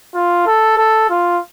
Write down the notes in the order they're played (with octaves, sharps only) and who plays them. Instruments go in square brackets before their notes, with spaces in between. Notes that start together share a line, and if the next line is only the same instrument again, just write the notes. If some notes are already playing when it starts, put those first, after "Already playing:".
[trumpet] F4
A4
A4
F4